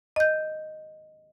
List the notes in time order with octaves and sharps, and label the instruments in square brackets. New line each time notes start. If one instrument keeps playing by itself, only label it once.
[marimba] D#5 G6